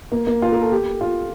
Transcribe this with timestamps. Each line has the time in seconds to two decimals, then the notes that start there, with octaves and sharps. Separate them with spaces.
0.12 A#3
0.27 A#3
0.42 F4
0.52 A#4
0.61 A4
0.72 G4
1.01 F4